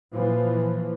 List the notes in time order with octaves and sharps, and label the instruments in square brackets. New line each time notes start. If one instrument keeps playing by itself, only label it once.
[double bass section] A#2 E3 F3